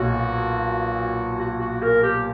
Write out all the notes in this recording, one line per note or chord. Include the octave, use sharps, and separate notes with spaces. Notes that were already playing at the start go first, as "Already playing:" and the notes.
Already playing: B1 A#2 F#4
F#4
F#4
A#4
G4